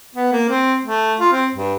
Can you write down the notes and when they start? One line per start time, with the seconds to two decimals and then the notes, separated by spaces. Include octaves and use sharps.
0.15 B3
0.33 A#3
0.49 C4
0.83 A3
1.20 F4
1.33 C4
1.55 G2